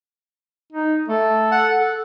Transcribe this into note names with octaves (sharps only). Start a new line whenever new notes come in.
D#4
A3 A4
F#5
A4